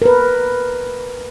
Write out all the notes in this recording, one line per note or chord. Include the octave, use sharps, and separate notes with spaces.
A#4 B4